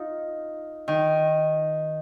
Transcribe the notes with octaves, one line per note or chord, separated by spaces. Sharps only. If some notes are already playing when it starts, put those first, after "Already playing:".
Already playing: D#4 F4
D#3